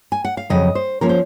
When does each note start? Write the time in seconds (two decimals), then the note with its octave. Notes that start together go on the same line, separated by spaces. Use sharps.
0.12 G#5
0.25 F#5
0.37 F5
0.50 F2 C#3 F#3 D#5
0.75 C5
1.01 F3 A#3 C#4 A#4
1.09 C5